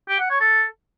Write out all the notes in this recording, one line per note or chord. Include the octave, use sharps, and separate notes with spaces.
G4
F#5
C#5
A4